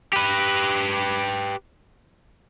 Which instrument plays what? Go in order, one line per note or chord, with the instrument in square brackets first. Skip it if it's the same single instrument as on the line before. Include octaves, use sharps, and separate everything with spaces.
[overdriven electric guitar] G4 B4